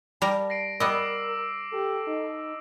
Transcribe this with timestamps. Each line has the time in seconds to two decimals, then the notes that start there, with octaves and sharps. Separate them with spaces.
0.22 G3 A#4 A5 A#5
0.50 A#6 C7 D7
0.80 G3 B3 A#4 D#5 D6 E6
1.72 G4 A4
2.07 D#4